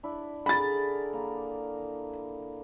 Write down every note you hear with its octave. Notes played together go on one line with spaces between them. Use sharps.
D4 E4
D3 G#4 A#4 B5 A6
A#3